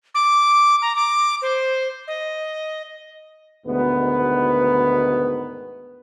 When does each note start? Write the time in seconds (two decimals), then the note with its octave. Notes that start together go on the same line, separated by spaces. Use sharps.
0.15 D6
0.82 A#5
0.96 D6
1.42 C5
2.08 D#5
3.66 D2 G#2 B2 D#3 B3